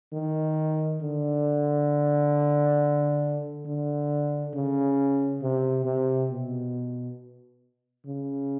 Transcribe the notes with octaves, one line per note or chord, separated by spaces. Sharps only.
D#3
D3
D3
C#3
C3
C3
B2
C#3